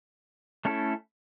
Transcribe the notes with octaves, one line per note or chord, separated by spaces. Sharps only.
A3 C#4 E4 A4